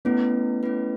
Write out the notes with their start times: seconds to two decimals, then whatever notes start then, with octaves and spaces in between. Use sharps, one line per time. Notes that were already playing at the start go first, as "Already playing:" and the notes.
0.05 A3 B3 C#4 E4 B4
0.63 A3 C#4 E4 B4